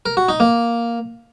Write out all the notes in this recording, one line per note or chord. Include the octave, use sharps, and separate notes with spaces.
A#4
F#4
D#4
A#3